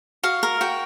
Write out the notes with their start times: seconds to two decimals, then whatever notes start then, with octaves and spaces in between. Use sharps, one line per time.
0.23 F#4 F5
0.43 A#4
0.61 F#4 G5